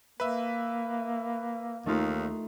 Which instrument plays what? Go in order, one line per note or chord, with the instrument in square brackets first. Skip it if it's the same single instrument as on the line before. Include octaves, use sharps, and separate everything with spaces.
[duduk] A#3 [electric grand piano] B4 E5
[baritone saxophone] D#2 [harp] A3 D#4 F4